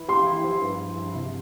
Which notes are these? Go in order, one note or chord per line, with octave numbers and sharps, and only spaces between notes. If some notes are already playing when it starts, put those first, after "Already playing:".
Already playing: E3 E4
G4 C6
E4
F3
G2
G2
G2
C3